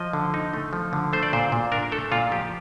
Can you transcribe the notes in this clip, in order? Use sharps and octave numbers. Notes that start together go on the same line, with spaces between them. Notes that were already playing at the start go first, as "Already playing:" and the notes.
Already playing: F3 D#5
D3
D#4
A3
F3
D3
A3 C5
D5
A#2 C5
A#2
D4 A#4
A3 A4
A#2 F4
F3 G4